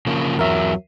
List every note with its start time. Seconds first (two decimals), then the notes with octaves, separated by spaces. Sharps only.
0.07 C#3 F3 A#3
0.39 E2 F#3 A#4 E5